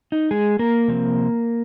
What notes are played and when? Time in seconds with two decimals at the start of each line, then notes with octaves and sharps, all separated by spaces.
0.12 D#4
0.31 G#3 G#4
0.59 A#3 A#4
0.88 C3 F3 C4